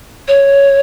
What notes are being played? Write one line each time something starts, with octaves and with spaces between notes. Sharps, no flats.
C#5